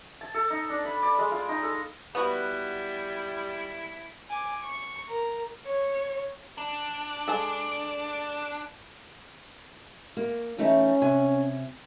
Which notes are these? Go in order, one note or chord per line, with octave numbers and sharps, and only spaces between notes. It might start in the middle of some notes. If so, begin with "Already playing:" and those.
A5
A4
D#4
D4
B5
D5
G#3
F4
D#4
A4
G3 B3 E4 F#4
G#5 D6
C#6
A#4
C#5
D4
G#3 G#4 A4
A#3
E3 A3 C#4 D#4
C3 G#5